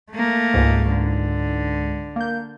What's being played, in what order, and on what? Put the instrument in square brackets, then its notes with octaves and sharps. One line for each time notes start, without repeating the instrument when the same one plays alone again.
[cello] A3 A#3
[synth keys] C#2 G#2
[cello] D3
[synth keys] A#3 G6